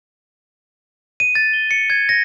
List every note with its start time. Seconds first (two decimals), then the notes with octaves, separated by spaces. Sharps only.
1.20 D#7
1.35 A6
1.54 G7
1.71 C#7
1.90 G#6
2.09 A#6